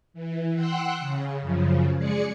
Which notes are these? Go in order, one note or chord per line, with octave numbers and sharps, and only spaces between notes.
E3
F#5 G5 C6 E6 F#6
C#3
F#2 C#3 F3
G#3 G#4 D5 C#7